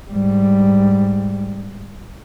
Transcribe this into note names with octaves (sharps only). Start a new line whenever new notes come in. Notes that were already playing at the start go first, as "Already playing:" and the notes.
G#2 G3